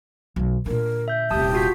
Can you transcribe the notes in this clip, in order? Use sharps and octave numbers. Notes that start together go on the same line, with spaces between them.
B1 D#3
A#2 D3 A#4
E5 G6
D#1 C3 G4 A5 D#6 G6
F4 F#4 B6